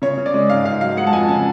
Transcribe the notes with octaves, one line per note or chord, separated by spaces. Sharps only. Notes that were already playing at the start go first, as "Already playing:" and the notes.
C#3 C#5
C#3
D5
G#3
G#2 F5
G#2 F5
F#3 F5
G#3 F#5
A5
F2 G#5
C#3 A5